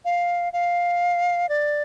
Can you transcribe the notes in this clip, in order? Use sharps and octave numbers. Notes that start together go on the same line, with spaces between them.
F5
F5
D5